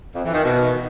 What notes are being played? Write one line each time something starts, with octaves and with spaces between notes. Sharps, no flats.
F2
E3
D#3
B2